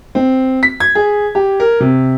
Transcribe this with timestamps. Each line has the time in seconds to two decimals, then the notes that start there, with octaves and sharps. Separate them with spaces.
0.15 C4
0.63 B6
0.80 G#6
0.95 G#4
1.35 G4
1.60 A#4
1.80 C3